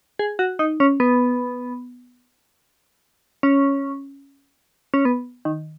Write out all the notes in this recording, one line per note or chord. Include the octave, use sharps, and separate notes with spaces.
G#4
F#4
D#4
C#4
B3
C#4
C#4
B3
D#3